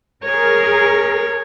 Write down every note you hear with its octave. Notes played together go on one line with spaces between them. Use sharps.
G#4 A#4 C#5